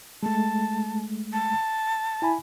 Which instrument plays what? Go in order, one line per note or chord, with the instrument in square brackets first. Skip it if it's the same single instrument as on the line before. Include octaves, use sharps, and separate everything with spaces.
[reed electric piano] G#3 A3 [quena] A5
[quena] A5
[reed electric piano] E4 G#5 B5